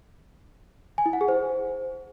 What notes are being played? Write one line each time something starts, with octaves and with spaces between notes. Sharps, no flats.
G#5
E4
F#5
G#4
C5